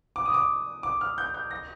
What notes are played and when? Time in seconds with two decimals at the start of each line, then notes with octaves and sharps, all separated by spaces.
0.16 D6
0.26 D#6
0.34 D6
0.83 D6
1.01 F6
1.18 G6
1.34 G6
1.51 A#6